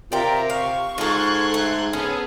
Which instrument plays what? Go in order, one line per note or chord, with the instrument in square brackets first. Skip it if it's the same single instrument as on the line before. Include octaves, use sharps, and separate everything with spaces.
[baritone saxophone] C3 [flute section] F4 A#4 E5 [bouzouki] D5 G5
[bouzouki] F5 [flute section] C#6
[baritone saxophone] G#2 [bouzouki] F4 A4 [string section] C6 F#6 G#6
[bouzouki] A3
[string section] B3 G#4 A4 [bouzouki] C#4